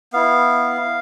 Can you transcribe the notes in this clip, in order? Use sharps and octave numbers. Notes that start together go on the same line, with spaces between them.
B3 E4 F5